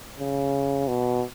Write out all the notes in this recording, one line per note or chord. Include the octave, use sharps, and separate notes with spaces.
C#3
B2